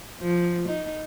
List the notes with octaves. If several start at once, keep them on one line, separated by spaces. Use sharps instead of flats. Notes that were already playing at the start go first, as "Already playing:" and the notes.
F3
D#4